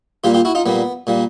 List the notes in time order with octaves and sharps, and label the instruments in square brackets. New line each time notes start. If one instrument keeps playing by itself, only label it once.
[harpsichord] A#2 G3 A#3 F4 G4
F4 G4
E4 F#4
D#4 F4
A#2 G3 A#3 B3
A#2 G3 A#3